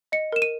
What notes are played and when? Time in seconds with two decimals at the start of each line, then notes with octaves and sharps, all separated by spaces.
0.12 D#5 C#7
0.32 A#4 E7
0.42 D#7